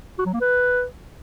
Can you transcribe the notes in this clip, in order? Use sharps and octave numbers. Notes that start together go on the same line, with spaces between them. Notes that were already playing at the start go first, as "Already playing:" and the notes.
F#4
F#3
A#3
B4